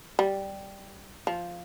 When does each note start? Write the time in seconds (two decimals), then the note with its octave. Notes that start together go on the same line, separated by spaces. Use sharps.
0.19 G3
1.27 F3